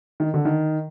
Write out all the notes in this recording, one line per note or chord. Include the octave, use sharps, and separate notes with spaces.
D#3
D3
D#3